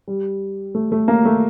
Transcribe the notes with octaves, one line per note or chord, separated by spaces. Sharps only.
G3
A3
A3
A#3
A3